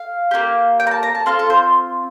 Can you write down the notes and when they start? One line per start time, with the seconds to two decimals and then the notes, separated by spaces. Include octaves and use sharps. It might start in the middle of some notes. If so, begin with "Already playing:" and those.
Already playing: F5
0.31 A#3 D#4 G4
0.80 G5
0.87 A#5
0.91 A5
1.03 A#5
1.15 A5
1.26 C4 F4 A4 F5
1.39 A4
1.50 C5